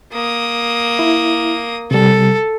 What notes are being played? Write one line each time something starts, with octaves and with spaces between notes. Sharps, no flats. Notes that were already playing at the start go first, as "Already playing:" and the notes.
A#3 D#6
E4
C3 G3 A4